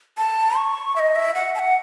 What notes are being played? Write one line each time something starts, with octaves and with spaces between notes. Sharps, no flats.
A5
C#6
E5
D#5
E5
F#5
A5
F#5